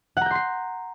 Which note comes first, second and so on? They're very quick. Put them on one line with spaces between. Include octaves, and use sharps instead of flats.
F#5 A#5 G6 C6 C7